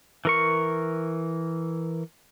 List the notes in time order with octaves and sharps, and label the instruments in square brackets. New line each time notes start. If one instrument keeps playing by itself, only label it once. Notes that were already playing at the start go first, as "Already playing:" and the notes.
[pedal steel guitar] E3 A#4 C#6